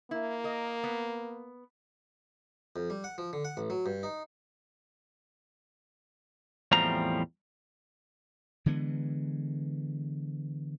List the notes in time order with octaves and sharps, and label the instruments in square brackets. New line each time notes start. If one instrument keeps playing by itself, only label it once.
[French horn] A#3 [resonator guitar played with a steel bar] E4
[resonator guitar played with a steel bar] A#4 D#5
B3
[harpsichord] F2
G3
F#5
F3
D3
F#5
A1
F#3
G2
D#4
[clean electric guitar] E2 A2 F3 G3 C4 A#5
[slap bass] D3 E3 G#3 B3